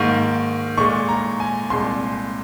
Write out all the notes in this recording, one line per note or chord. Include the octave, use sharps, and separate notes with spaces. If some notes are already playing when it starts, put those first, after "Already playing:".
Already playing: G#2 D#3 A#3 C#6
A#2 G#3 C#6
A#5
G#5
C2 A#2 G#3 C6